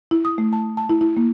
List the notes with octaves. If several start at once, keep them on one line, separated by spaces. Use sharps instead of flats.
E4
D#6
A3
A5
A5
E4
E4
A#3